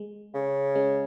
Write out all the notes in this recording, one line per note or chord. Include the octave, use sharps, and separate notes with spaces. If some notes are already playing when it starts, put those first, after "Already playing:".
Already playing: G#3
C#3
G#3 C#4